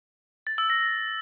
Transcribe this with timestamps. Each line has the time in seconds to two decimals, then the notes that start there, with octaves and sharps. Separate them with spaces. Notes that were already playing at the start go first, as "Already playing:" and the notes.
0.47 A6
0.58 E6
0.70 A#6